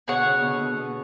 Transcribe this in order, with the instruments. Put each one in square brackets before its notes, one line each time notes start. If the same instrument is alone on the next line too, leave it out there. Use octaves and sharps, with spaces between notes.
[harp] B2 D3 [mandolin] G#4 C#5 F#5
[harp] C#3
C#3
B2 D3
B2
B2